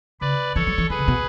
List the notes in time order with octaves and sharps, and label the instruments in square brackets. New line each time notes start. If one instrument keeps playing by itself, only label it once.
[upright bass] C#3 [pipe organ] B4 D5
[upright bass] E3 [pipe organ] A4 C#5
[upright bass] F#3
E3
[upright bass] E3 [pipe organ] G#4 B4
[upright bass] C#3
B2